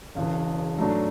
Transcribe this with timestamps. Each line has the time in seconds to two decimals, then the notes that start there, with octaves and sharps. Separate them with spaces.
0.15 E1 E2 C#3
0.78 G#2 F#3 A3 D4